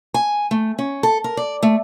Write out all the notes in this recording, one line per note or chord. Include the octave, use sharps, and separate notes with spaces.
G#5
A3
C#4
A4
A#4
D5
A3